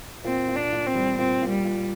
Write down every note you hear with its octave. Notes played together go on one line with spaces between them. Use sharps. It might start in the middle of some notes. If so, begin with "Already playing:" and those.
A#2 C4
A#2
D4
A#2
C4
G3
A#2 C4
A#2
G3
A#2